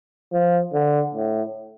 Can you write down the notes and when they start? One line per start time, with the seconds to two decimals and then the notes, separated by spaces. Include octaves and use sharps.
0.33 F3
0.73 D3
1.14 A2